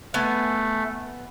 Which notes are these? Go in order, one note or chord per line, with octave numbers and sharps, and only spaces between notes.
A3 B3 G#5